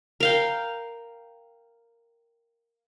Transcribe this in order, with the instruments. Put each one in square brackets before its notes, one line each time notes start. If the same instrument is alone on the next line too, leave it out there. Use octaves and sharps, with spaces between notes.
[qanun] A#4 F5 G5